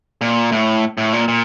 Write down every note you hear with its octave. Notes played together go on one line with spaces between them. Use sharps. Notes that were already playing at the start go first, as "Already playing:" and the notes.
A#2
A2
A2
A#2
A#2